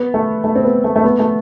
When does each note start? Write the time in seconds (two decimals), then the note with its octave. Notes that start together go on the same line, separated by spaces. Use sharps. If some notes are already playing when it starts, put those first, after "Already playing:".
Already playing: B3
0.14 A3
0.44 A3
0.55 C4
0.64 B3
0.84 A3
0.96 A3
1.04 B3
1.19 A3